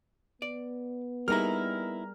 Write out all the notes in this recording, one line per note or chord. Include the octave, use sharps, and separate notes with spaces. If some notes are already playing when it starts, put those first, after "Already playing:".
B3 D5
G3 A#3 D#4 E4 G#4 A#4 A#5 F6